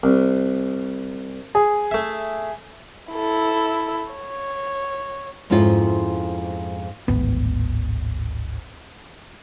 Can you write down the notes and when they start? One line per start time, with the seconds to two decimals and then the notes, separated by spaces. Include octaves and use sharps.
0.03 C2
1.55 G#4
1.91 A3 E5
3.13 E4 A4
4.12 C#5
5.50 F2 G#2 C#4 E4 F4
7.08 D1 G#1 B3